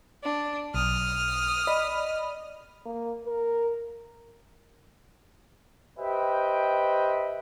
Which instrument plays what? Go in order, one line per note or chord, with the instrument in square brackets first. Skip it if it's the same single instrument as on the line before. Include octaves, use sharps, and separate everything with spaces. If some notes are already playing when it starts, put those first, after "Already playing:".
[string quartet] D4
[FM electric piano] B1 [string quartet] D#6 F6
[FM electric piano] D5 D#5 B5
[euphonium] A#3
A#4
[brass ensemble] G4 B4 C5 D#5 E5 G5